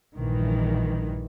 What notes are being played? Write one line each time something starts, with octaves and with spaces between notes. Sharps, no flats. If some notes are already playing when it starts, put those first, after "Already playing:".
A#1 G2 D#3 E3